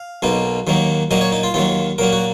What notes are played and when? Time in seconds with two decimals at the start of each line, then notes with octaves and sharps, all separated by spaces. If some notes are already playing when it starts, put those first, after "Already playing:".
Already playing: F5
0.22 B1 B2 A#3 D#4
0.67 D#2 D#3 F#3 A#3
1.11 A#2 F#3 A#3 D#5
1.21 C#5
1.32 D#4
1.43 F4
1.54 D#2 D#3 F#3 F4
1.98 A#2 F#3 A#3 A#4
2.12 F#4